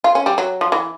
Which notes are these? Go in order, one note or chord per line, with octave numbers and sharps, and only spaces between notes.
F4
C#4
G3
F#3
F3
E3